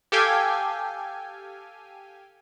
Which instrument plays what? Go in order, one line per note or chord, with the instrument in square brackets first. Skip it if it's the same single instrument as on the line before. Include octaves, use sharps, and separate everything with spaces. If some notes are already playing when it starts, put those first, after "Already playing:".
[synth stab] G4 A4 F5 G5 G#5